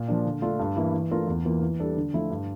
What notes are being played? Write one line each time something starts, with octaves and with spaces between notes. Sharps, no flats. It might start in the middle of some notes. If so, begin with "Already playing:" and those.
Already playing: A#2
F3 A#3 D4
D3
A3 D4 F4
G2
E3 A#3 E4
E3
A3 D4 F4 A#4
E2
E3 A#3 F4
E3
G3 D4 A4
D3
F3 A3 E4
G2